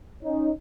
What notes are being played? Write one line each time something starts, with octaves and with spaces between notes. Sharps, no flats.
C#4 D#4